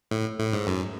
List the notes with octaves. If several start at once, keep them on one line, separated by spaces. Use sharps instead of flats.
A2
A2
G#2
F#2